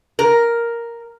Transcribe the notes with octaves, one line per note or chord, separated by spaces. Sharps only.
A#4